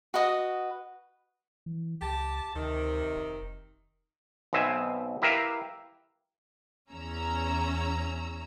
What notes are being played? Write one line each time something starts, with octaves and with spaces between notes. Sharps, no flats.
F#4 B4 D#5 D#6
E3
C#2 G4 A5
D2 C3 D#3
F1
B1 B2 C4 E5 G#5
E4 G4 A#4 B4 E5 F5
E2 C#4 A#5 E6